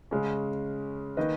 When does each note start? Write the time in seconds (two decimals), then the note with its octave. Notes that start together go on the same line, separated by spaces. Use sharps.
0.11 C#3 G#3 C#4
1.17 D#3 A#3 B4 D#5